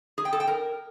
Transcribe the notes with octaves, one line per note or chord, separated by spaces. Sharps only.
G#4
G5
A4
G5
A#4